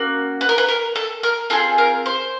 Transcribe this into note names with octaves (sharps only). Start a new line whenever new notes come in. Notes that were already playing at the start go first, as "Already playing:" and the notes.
Already playing: A#3 C#4 F#4
B4
A#4
B4
A#4
A4
A#4
C4 F4 G#4 A4
A#4
C5